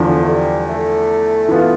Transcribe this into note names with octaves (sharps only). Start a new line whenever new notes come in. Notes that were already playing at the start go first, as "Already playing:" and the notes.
Already playing: E2 D3 F3
A3
G3
A3
E3 B3 F4